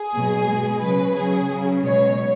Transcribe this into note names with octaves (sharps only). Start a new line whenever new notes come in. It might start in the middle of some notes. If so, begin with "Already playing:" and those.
Already playing: G#4
B2 F#3
B2 G#3
C#3 F#3 B4
C#3 F#3 G#4
C#3 F#3
B2 G#3 C#5